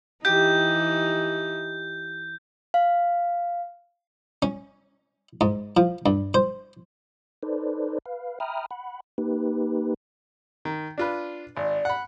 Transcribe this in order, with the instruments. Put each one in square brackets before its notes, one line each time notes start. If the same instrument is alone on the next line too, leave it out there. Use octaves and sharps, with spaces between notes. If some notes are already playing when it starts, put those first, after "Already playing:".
[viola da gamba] E3 D#4 [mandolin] G4 [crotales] G6
[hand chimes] F5
[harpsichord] C#4
G#2
F3
G2
C5
[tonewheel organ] D#4 A4 B4 C5 D5
B4 F5
E5 G5 A#5 B5 D#6 F6
F#5 B5
A#3 D#4 G4 B4
[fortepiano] D#3
D4 F4 B4
[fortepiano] G#1 [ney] D5
[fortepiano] F#5 B5